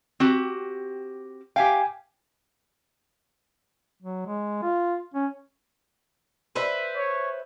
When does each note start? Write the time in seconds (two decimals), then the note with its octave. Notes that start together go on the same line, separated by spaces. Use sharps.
0.20 C4 F#4 G4
1.56 G4 E5 F5 G5 G#5
4.03 F#3
4.27 G#3
4.63 F4
5.14 C#4
6.55 B4 C5 E5
6.96 C#5